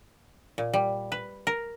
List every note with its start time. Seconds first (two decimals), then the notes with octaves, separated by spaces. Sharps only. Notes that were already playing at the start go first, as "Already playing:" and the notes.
0.58 A#2
0.73 G3
1.12 B4
1.47 A#4